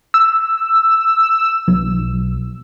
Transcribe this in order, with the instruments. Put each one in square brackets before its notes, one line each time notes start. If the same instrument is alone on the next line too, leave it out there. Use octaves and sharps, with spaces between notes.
[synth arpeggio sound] E6
B1